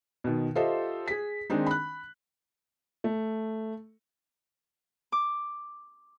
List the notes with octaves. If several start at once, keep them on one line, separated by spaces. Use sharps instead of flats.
B2 D#3
F4 G4 A4 C5 D#5 E5
G#4 B6
D#3 G#3 C4 D4 D#4
B5 F#6
A3
D6